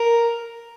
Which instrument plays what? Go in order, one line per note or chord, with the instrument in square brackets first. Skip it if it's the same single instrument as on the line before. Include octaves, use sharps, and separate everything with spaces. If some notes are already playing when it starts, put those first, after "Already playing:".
Already playing: [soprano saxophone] A#4